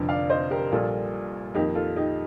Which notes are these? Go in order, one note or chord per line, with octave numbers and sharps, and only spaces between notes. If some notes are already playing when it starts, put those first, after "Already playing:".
Already playing: F1 F2 D3
D5 F5
C5 D#5
G4 A#4
A#1 A#2 G3 A#3 F4 A4
F2 D#3 A#3 D#4 G4
F4 A4
D#4 G4